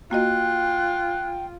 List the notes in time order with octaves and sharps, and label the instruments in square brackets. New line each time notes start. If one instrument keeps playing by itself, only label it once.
[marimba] A#3 F#4 D#5 [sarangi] F4 [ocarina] G5 [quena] F#6